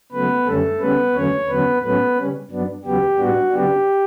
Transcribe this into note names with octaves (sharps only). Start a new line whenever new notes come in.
C#3 F#3 A3 B3 B4
F#2 D3 G3 A3 C#4 A4
C#3 G3 B3 C#4 B4
E2 D3 F#3 A3 C#4 C#5
E2 D3 F#3 B3 C#4 B4
A2 F#3 A3 B3 C#4 B4
C#3 G3 C#4
G2 F#3 B3 D4
E2 C#3 F#3 B3 G4
A2 G3 B3 D4 F#4
C#3 F#3 B3 D4 G4